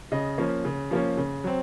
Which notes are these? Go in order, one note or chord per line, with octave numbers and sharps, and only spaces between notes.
C#3 D#5
F3 A#3 C#4
C#3
F3 A#3 C#4
C#3
F#3 C4